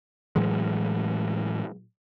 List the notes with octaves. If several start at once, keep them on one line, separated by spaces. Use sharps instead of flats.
A2 E3 F#3 G#3